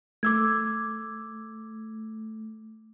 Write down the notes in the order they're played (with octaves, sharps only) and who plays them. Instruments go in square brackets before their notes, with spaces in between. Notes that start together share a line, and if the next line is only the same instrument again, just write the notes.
[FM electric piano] A3 [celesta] D6 E6 G#6